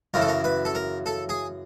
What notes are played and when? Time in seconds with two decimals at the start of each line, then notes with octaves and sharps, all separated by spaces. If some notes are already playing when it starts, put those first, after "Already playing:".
0.14 F#2 C#3 E3 A#4
0.21 A4
0.28 A#4
0.44 B4
0.65 A4
0.75 A#4
1.06 A4
1.29 G#4